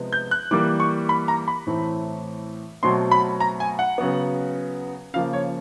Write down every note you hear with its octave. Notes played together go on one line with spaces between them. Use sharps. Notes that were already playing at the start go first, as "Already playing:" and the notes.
Already playing: C3 F3 G#3 B3
G6
F#6
E3 G3 A#3 D6
C#6
B5
A#5
B5
A2 E3 A3 C4
B2 F#3 A3 C4 C6
B5
A#5
G#5
F#5
C#3 F#3 B3
C#3 F3 A#3 F5
C#5